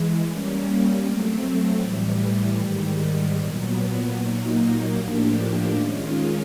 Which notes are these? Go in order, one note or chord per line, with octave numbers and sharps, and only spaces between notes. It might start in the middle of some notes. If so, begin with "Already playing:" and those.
Already playing: E3 G#3
G3 A#3 C#4
F#3 A3 C4
A2 E3 G3
G#2 D#3 G3
A#2 F#3 B3
A#2 F#3 A#3 D#4
A2 F3 A#3 D4 G4
D#3 G#3 C#4 F4